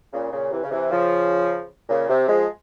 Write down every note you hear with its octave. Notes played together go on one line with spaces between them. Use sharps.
A#2 C#3
A#2 C#3
C3 E3
C#3
C3 E3
C#3 F3
A#2 C#3
C3
F3 G#3